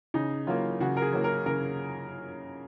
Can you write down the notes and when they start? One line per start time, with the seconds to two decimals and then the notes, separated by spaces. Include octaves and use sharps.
0.14 C#3 D#4
0.47 F#3 A#3 F4
0.80 C#3 F#4
0.97 A#4
1.02 G#4
1.13 F#3 A#3
1.24 A#4
1.46 C#3 A#4